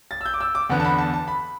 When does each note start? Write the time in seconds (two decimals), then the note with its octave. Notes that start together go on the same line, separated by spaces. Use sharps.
0.11 A6
0.21 E6
0.26 G6
0.34 D6
0.40 E6
0.55 D6
0.69 E2 D3 B3
0.80 A5
0.85 B5
0.98 A5
1.13 A5
1.28 B5